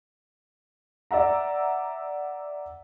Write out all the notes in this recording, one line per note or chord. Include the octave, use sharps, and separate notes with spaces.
D5 E5 F#5 A#5